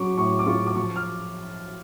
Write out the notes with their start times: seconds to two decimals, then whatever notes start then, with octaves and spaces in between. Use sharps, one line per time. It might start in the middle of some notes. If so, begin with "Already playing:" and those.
Already playing: F#3 C#4 C#6 D6
0.18 A2 C#6
0.39 D6
0.46 F4 C#6
0.67 D6
0.76 F3 C#6
0.96 F6